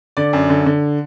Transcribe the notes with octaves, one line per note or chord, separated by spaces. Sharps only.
D3 D5
F#2
D3
D3